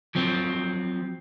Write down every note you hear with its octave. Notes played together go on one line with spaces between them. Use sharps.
F3 F#3 C4